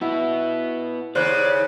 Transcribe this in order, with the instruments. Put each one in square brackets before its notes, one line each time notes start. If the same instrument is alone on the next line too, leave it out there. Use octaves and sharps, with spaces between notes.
[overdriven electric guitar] B3 F#4 [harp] E4
[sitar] D#2 C#3 [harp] C5 F#6 [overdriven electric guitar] D5